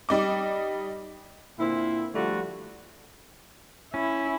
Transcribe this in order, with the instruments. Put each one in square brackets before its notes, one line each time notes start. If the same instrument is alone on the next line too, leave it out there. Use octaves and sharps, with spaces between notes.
[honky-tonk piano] G3 D#4 D6
[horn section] A#2 D3 C4 E4
D3 F3 G3 A3 F4 F#4
[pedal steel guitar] C#4 [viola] E4